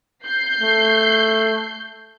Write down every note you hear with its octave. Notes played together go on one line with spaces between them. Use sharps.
G6 C7
A3